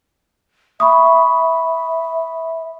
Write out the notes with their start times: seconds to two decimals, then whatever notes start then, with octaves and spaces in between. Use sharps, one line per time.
0.80 E5 B5 C#6 D#6